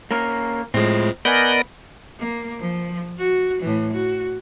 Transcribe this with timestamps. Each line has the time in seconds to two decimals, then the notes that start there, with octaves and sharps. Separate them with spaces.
0.11 A#3 C#4 A#4
0.74 A2 F3 G#3 C4
1.25 B3 A#4 D5 D#5 G#5 F#6 G6
2.20 A#3
2.59 F3
3.18 F#4
3.62 A2 E3
3.92 F#4